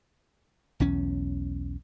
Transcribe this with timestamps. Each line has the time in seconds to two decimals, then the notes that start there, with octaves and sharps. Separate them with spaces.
0.80 B1 E2 C#4